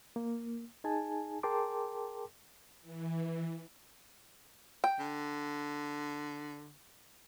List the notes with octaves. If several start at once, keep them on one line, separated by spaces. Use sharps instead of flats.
A#3
D#4 G#4 G#5 A5
G#4 A#4 G5 A5 C6 D6
E3
G5
D3